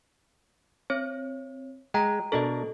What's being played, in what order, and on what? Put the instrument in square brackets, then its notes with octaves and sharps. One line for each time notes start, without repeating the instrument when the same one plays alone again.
[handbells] C4 C#5
[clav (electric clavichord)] G#3 [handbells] G5 A#5
[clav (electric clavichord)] B2 D4 A#4 [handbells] A4 D#5